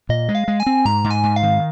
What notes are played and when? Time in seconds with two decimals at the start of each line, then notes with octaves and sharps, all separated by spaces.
0.09 A#2 D#5
0.29 G#3
0.35 F5
0.48 G#3
0.60 G#5
0.66 C4
0.85 G#2 A#5
1.04 G#2
1.11 G#5
1.23 G#2
1.36 F5
1.43 D#3